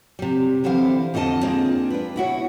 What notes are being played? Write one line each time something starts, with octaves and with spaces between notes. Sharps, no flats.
C3 G3
D3 E3 C4 E4 C5 F5
F2 D3 F4 D#5 A5
G#3 A#3 C4 D4 F4 G#4
D4 B4
B2 E4 F#4 C#5